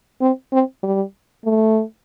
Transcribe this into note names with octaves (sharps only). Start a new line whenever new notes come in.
C4
C4
G3
A3